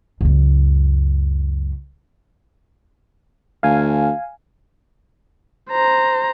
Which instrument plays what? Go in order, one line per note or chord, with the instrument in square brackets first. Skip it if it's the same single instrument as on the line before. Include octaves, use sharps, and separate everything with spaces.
[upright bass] C#2 F#2
[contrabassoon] D2 [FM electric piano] F5 G#5
[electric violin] C5 A#5